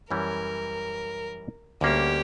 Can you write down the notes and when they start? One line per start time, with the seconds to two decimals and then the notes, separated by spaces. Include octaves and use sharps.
0.11 F#2 E3 G3 C#4 A#4
1.81 D2 D3 G3 A#3 C#4 G4